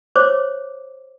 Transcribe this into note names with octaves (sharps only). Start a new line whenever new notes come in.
C5 C#5 D6